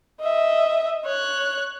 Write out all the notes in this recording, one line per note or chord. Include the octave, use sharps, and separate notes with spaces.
D#5 E5
C#5 F#6